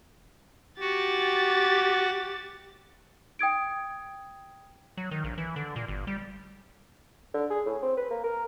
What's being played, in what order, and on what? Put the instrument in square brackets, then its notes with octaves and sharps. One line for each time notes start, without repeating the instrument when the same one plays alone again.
[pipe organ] F#4 [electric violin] G4 A6
[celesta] G5 D#6 G#6 D7
[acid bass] F#3
D#3
A#1
E3
D3
A#2
G1
G3
[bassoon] D3
G#4
A2
C4
B4
A#3
A#4